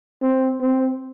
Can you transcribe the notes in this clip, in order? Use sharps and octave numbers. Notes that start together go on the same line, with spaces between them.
C4
C4